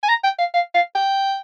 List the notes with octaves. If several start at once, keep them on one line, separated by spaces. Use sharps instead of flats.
G#5
A#5
G5
F5
F5
F5
G5